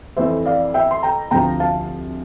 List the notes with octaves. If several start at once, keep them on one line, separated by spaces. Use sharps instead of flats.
F2 E3 A3 C5 E5
D5 F5
E5 G5
C6
G5 A#5
D2 C3 F3 G5 A#5
F5 A5